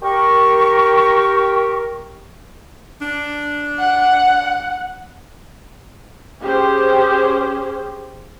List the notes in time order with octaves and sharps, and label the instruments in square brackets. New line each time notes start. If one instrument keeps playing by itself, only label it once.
[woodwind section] G4 A#4 [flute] C#6
[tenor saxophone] D4
[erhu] F#5
[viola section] C#4 G4 G#4 C5